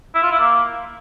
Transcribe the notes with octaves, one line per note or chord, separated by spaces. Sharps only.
E4
F4
E4
A#3